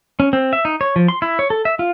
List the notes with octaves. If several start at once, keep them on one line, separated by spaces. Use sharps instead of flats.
C#4
C4
E5
D#4
C#5
F3
C6
E4
C#5
A4
E5
F4